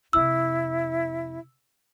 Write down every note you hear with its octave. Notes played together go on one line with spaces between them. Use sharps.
F2 C3 E4 E6